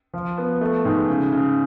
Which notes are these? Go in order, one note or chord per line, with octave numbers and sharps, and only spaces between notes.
F3
B3
A3
G#2
C#3
C#3